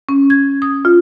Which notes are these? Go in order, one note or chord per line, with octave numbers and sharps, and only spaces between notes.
C#4
G#6
D#6
F4